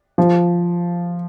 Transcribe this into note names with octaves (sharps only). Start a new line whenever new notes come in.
F3